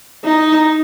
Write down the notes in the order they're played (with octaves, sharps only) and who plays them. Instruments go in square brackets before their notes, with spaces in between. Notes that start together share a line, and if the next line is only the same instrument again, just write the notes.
[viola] D#4